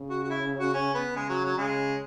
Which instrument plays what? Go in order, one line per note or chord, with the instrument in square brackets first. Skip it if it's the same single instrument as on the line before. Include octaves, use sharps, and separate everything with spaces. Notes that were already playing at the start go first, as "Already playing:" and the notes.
Already playing: [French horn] C#3
[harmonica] F#4
F#4
E4
F#4
C#4
B3
[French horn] C#3 [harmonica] G#3
[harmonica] F#3
F#3
[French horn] C#3 [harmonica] G#3